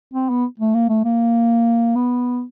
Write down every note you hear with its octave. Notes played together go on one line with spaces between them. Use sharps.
C4
B3
A3
A#3
A3
A#3
B3